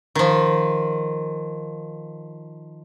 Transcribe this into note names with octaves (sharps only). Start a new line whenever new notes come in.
D#3 F3